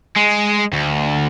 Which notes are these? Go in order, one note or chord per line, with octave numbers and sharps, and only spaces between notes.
G#3
D2